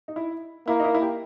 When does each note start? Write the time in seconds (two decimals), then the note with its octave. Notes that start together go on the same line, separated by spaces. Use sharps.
0.08 D#4
0.16 E4
0.67 A#3 E4
0.80 D#4
0.84 E4
0.95 E4
1.02 G4